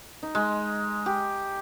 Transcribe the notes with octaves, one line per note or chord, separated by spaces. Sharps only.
D#4
G#3
G4